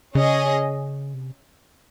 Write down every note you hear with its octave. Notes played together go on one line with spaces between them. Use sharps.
C#3 C#4 G#4 D#5
C3